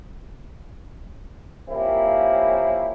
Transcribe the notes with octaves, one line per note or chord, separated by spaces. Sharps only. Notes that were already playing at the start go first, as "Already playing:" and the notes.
F3 A#3 C4 C#4 E4 G4